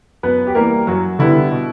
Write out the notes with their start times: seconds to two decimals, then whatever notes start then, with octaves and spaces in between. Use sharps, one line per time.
0.23 F#2 B3 B4
0.47 G4
0.55 E3 G3 A#3 A#4
0.87 F#2 F#3 F#4
1.19 D3 G3 B3 E4
1.51 B2